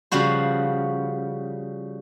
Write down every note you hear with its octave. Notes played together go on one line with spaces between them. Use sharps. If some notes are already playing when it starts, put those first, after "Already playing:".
C#3 F3 G3 F#4 C5